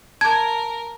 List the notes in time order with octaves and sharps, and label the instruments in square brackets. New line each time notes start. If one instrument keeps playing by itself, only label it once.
[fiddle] A#4 [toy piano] A5 D6 [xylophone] G#6